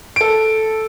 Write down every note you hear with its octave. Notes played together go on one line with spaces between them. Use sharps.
A4 D7